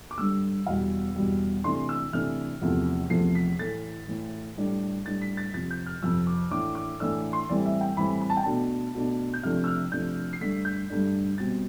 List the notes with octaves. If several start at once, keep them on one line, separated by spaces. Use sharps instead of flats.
D6
G2 D3 G3 E6
E2 B2 G3 F5
E2 B2 G3
C3 E3 A3 D4 C6
E6
C3 E3 A3 D4 F6
E2 C3 F3 A3
E2 C3 F3 A3 C7
B6
A2 E3 A3 A6
A2 E3 A3
A2 G3 D4
A2 G3 D4 A6
B6
A6
F2 C3 F3 A6
G6
F6
F2 C3 F3 E6
D6
A2 E3 A3 D4 D6
D6
A2 E3 A3 D4 E6
C6
A2 E3 G3 C4 D5
E5
G5
A2 E3 G3 C4 B5
B5
A5
G5
B2 A3 D4 A5
B2 A3 D4
G6
C3 F3 A3 D4 F6
E6
F6
C3 F3 A3 D4 G6
C7
G2 D3 A3 D4 B6
G6
G2 D3 A3 D4
B2 G3 C4 A6